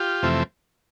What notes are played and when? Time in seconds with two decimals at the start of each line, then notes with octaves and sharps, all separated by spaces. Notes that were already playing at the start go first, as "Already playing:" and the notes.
Already playing: F4 G4
0.23 F2 C3 E3 A3 C4